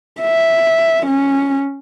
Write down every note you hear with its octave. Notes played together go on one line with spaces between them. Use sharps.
E5
C#4